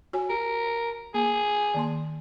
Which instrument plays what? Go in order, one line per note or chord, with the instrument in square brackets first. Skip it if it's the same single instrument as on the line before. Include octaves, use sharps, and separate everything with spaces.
[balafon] F#4 C#5 G#5
[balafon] G4 [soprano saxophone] A#4
[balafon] A#3 [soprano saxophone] G#4
[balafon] D#3 A#3 C6